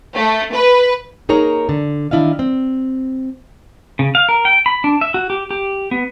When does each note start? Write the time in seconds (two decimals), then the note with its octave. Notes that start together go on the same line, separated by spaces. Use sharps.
0.14 A3
0.52 B4
1.29 A#3 D#4 G#4 A#4 C#5 A#5
1.69 D3
2.11 D#3 D4 E4 D#5 F5
2.39 C4
3.99 C#3
4.15 F5
4.29 A#4
4.45 G5
4.66 B5
4.84 D4
5.01 E5
5.14 F#4
5.30 G4
5.51 G4
5.91 B3